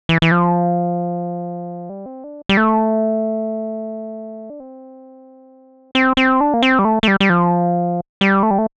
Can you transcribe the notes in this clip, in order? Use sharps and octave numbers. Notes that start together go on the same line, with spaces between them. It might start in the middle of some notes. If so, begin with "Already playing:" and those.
E3
E3
F3
G3
C4
D4
G3
A3
D4
C4
C4
C4
D4
A#3
C4
G3
A3
A3
G3
G3
F3
G3
A3
G3
A3